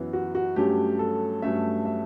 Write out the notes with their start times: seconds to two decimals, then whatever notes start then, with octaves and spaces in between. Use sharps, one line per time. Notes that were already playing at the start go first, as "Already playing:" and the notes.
Already playing: F#2 E3 B3
0.13 F#4
0.35 F#4
0.56 G2 F#3 A3 C#4 G4
0.99 A4
1.42 G2 F#3 A3 C#4 E5
1.85 E5